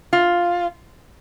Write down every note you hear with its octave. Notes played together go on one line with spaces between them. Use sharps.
F4